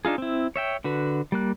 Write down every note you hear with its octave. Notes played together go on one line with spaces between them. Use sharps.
D4 D#4 F4 G#4
C4 E4
C#5 E5 G5
D3 F#4 B4
G3 A#3 F#6